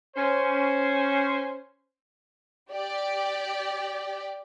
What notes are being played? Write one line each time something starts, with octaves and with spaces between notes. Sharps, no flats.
C#4 C5
G4 D5 G5